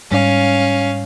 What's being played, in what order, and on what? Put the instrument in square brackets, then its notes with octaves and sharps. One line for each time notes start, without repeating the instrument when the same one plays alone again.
[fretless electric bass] G#2 G3 [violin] C#4 F5